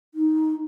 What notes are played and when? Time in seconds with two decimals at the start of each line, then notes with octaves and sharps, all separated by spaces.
0.15 D#4